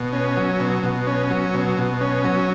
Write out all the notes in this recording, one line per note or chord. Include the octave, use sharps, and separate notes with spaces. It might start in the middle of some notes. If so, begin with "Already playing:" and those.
Already playing: B2
C#4
F#3
B2
B2
C#4
F#3
B2
B2
C#4
F#3